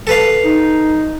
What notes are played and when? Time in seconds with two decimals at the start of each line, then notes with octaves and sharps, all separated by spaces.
0.07 A4 B4 F5
0.44 D#4